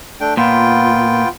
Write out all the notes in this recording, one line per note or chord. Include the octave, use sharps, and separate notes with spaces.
A3 D4 G5
A#2 B3 F4 G5